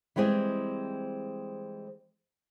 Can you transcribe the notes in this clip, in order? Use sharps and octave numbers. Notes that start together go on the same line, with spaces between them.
E3 G3 G#3 C4 G#4